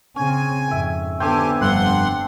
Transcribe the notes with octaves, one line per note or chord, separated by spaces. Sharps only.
C#3 C4 C#4 G#5
F2 G#2 E5 G5
D3 B3 C4 D4 G4 A4 G#5 G6
F1 G2 F#5 C6 F#6